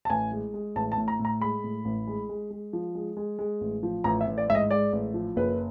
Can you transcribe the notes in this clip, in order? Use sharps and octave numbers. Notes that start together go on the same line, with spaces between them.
A5
A1 G#5
G#3
G#3
A1 A5
A5
A2
A#5
A2
A#5
G#3 B5
A2
A1
G#3
G#3
G#3
F3
G#3
G#3
G#3
A1
F3
A1 A#5
E5
A1
D5
G#2 E5
D#5
G#3 D5
A1
F3
F#1 B4